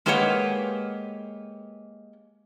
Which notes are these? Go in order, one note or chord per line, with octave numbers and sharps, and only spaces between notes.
G#3 A#3 G4 B4 C#5 F#5